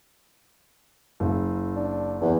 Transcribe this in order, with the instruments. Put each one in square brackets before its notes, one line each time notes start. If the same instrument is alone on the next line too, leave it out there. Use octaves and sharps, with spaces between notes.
[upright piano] F#1
[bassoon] D4
E2